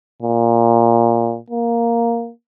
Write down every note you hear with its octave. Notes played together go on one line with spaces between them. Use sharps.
A#2
A#3